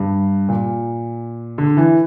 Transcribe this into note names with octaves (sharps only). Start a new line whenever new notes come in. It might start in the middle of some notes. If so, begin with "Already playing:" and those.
Already playing: G2
A#2
D3
E3